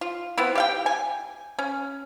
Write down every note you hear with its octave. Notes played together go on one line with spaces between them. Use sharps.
F4
B3 C4 E4
G4 F5 G5
G#5
C#4